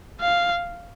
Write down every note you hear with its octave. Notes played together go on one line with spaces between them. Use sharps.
F5